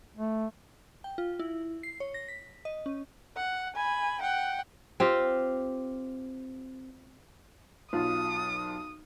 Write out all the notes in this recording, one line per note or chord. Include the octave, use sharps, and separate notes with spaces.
A3
G5
F4
E4
C7
C#5
A#6
B6
D#5
C#4
F#5
G#5 B5
F#5 G5
C4 F4 G4
B1 F4 D#6